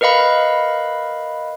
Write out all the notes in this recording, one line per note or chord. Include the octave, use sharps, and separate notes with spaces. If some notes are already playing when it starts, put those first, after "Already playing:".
A#4 B4 D#5 F5 B5